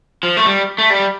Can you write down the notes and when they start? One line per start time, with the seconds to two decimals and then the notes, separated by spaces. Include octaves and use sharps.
0.23 F3
0.37 A3
0.46 G3
0.78 A3
0.90 G3